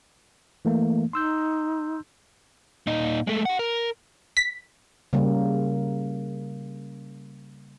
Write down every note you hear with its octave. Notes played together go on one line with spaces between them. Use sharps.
E3 A3 A#3
D#4 C6 E6 G6
A#2 D#4
G#3 A3
G4 F#5
A#4
B6
C#3 G3 A#3